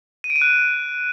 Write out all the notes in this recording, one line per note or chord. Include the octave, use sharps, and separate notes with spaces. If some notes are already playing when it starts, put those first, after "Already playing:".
D#7
D7
D#7
F#6